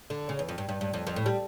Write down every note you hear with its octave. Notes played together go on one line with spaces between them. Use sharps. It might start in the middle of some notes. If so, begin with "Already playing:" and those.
D3
C#3
E2
F2
G2
G2
G2
F2
F2
A2
G3